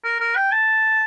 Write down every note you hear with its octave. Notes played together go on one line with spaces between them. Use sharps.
A#4
A#4
G5
A5